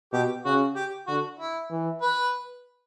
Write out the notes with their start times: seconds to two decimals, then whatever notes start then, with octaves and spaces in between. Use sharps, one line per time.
0.13 B2 G4
0.45 C#3 F#4
0.76 G4
1.07 D3 F#4
1.40 E4
1.71 E3
2.02 B4